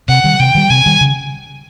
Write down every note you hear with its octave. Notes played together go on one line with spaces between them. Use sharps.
C3 F#5
D#3 G3
C3 G5
D#3 G3
C3 G#5
D#3 G3
C#3